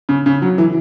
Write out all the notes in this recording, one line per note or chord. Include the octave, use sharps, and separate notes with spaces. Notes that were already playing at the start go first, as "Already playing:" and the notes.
C#3
C#3
F#3
E3